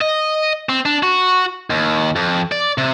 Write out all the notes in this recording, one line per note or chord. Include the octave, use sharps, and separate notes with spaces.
D#5
C4
D4
F#4
D#2
F2
D5
C3